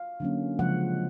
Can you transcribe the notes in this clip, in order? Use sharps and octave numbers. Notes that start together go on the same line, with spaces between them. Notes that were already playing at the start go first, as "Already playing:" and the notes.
Already playing: F5
D3 F#3 A#3 C#4
C#3 F3 G#3 F#5